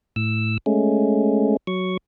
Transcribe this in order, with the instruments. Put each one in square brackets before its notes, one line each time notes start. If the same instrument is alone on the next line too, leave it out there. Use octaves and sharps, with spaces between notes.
[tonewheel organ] A2 E6
G#3 A3 C#4
F#3 C#6